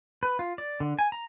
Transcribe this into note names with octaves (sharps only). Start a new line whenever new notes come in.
B4
F4
D5
D3
G#5
A#5